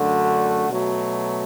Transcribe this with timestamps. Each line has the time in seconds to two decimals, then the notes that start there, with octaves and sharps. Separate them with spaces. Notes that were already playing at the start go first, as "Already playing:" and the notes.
Already playing: F#2 D3 A3 D4 F#4
0.68 B2 F#3 A3